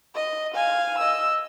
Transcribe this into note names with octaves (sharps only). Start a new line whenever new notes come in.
D#5
F5 G#5
D#5 E6